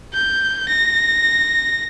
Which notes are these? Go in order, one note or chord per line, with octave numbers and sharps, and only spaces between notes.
G6
A#6